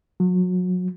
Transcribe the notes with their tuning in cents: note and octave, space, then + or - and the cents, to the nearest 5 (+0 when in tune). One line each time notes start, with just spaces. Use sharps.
F#3 -30